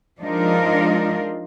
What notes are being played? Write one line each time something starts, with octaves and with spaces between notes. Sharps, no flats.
F3 G#3 D4 D#4 F4 A#4